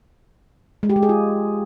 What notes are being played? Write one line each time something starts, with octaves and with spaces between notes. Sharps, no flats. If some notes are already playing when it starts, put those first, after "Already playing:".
G#3
G4
G#3
G#4
F4